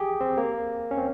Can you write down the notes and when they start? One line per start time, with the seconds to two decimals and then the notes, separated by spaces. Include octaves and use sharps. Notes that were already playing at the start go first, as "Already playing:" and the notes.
Already playing: G4 G#4
0.21 C4
0.38 A#3
0.91 C#4
0.98 C4